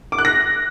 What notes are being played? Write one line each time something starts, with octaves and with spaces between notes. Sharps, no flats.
D6
F#6
A#6